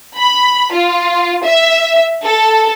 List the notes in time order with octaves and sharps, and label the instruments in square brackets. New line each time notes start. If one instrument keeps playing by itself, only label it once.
[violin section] B5
F4
E5
A4